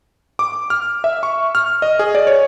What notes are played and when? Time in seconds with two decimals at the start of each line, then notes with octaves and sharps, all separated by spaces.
0.39 D6
0.70 F6
1.04 E5
1.23 C#6
1.55 F6
1.82 D#5
1.99 G#4
2.15 D5
2.27 C#5